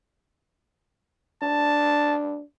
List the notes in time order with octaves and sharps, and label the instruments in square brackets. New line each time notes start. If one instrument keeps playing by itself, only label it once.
[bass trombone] D4 [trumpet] A5